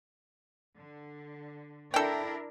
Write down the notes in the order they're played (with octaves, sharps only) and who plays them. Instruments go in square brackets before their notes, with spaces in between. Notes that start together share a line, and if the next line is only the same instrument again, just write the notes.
[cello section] D3
[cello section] D4 E4 A#4 [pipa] A4 G5